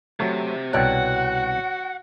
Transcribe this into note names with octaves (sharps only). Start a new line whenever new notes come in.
C3 F#3 A3
C2 B2 F#4 A4 C#5 D5 F#5 G5